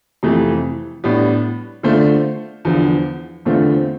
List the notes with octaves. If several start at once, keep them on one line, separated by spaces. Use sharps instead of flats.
F2 C3 E3 A3
A2 G3 B3 D4
D3 A3 D4 F4 C5
E2 D3 F3
E2 D3 A3 C4 F4